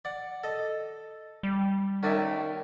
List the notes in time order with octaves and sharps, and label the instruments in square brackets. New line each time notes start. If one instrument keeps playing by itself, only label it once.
[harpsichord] D5 F#5
A4 D#5
[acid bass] G3
[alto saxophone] D#3 [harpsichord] C#4 D5 E5